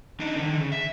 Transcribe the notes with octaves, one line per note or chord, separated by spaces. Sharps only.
D4 D#4
D3 D#3
C#3
E5